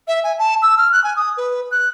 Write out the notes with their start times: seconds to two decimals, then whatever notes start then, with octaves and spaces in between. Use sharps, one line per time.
0.08 E5
0.24 G#5
0.39 A5
0.62 E6
0.77 F6
0.92 F#6
1.04 G#5
1.16 D#6
1.37 B4
1.71 F#6